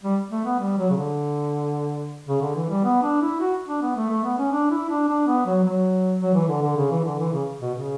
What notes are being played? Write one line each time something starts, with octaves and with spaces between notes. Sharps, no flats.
G3
A3
B3
G3
F#3
C#3
D3
C#3
D3
E3
G3
B3
D4
E4
F#4
D4
B3
A3
A3
B3
C#4
D4
E4
D4
D4
B3
F#3
F#3
F#3
E3
D3
D3
C#3
E3
D3
E3
C#3
B2
C#3